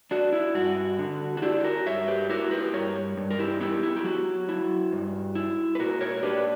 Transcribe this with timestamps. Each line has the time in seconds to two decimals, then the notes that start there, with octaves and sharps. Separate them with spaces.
0.11 D4 F#4
0.33 E4
0.55 G2 F#4
0.99 D3
1.37 F#4
1.42 D4 E4 G4
1.60 G4
1.64 F#4 A#4
1.86 G2 C#5 E5
2.07 G4 B4
2.29 E4 F#4 A#4
2.51 G4 B4
2.73 G2 A#4 C#5
3.17 G2
3.31 A#4
3.39 E4 G4
3.60 B3 E4 G4
3.83 E4
3.96 G4
4.04 F#3 F#4
4.49 E4
4.92 G2
5.35 E4
5.75 B4
5.79 A#2 F#4 A#4
6.01 A#4 C#5
6.17 A#4
6.23 D4 G4 B4
6.37 B4